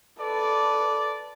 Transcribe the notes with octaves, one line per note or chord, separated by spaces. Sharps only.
A4 B4 D5